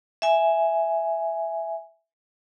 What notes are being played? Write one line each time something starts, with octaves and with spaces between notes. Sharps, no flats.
E5 G#5